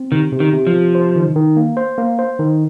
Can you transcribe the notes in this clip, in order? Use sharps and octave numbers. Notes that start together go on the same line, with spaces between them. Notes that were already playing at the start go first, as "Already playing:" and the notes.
Already playing: C4
C3 D#3
C3
D#3
C3
F3
C3
C5
D#3
D#3
A#3
C5
A#3
C5
D#3